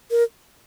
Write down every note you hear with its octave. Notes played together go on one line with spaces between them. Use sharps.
A#4